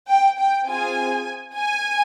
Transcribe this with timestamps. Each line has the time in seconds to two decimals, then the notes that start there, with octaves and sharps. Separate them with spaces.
0.08 G5
0.38 G5
0.67 C4 F4 G#4 G#5
1.55 G#5